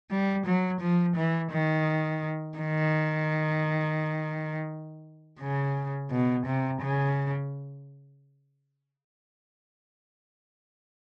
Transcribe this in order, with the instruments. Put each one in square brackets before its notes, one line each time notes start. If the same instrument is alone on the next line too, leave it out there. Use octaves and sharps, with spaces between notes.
[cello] G3
F#3
F3
E3
D#3
D#3
C#3
B2
C3
C#3